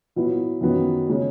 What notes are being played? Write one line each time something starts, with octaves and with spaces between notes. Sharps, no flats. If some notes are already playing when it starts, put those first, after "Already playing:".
A#2 F#3 B3 E4
F#2 D#3 F#3 B3
C#3 G#3 C#4